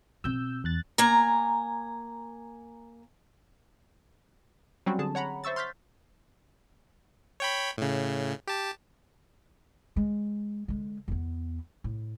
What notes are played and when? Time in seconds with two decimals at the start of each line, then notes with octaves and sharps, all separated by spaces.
0.24 B2 C4 E6 G6
0.64 E2 F#6 A6
0.98 A#3 G#5 A#5
4.86 F#3 G3 C4 C#4 F#4
4.99 D3 G#4 A5
5.15 C#5 F#5 A#5 B5
5.44 C5 E5 C#6 E6 A6
5.56 C6 F6 G6 A6 B6
7.40 C#5 G5 B5
7.78 A2 C#3
8.47 G4 A5
9.96 G#3
10.68 D3 G#3
11.08 E2 B3
11.84 A2